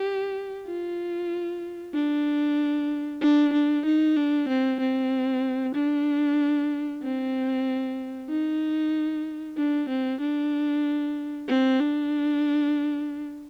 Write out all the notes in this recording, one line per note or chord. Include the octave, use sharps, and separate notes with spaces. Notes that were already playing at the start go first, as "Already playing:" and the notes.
Already playing: G4
F4
D4
D4
D4
D#4
D4
C4
C4
D4
C4
D#4
D4
C4
D4
C4
D4